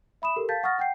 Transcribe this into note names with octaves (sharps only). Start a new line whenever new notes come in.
E5 B5 D#6 E7
G4 A4 A#4
F5 A5 G6 A6 B6
F#5 C#6 D#6 F6 A6 A#6
F#5 G5 G6 C7